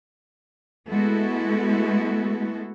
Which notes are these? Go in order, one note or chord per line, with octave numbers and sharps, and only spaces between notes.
G#3 A3 B3 E4 F#4 A4